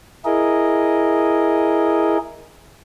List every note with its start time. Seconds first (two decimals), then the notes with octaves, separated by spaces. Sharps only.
0.25 E4 G#4 A#4 D#5